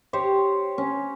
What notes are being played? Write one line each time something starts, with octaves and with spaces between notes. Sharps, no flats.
G4 C5 C#5
C#4